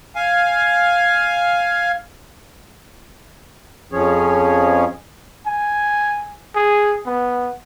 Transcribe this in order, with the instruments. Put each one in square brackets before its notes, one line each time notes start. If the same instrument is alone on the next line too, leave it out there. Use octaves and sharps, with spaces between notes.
[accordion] F5 G#5
[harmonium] F2 F3 C#4 G#4 C#5
[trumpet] G#5
G#4
B3